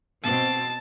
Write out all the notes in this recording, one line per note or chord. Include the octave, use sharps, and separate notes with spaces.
B2 C4 A5